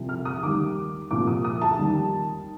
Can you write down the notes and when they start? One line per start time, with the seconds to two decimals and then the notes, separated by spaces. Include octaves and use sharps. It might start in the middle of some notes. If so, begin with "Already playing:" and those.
Already playing: C2 C3 F3
0.09 F6
0.25 D#6
0.43 D#2 D#3 G3 D6
1.11 C2 A#2 F3 D6
1.27 D#6
1.44 D#6
1.61 A5
1.79 D#2 D#3 G3